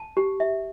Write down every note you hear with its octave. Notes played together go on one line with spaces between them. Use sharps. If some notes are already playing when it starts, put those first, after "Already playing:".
Already playing: A5
G4
E5